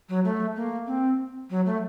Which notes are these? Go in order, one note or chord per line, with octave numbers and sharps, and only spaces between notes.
F#3
A3
A#3
C4
F#3
A3